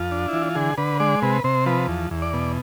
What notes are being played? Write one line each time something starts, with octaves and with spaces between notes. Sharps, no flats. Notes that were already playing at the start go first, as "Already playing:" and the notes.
Already playing: F2 F4
D4
E4
E3
F4
D3 G#4
D3 B4
G#3 D5
C3 B4
C3 C5
F3 B4
E2
E2
D5
B2